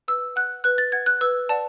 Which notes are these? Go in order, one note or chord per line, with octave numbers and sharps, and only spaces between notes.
B4 E6
F#5 F#6
B4 F#6
A6
F#5 G#6
F#6
B4 E6
D5 F#5 A5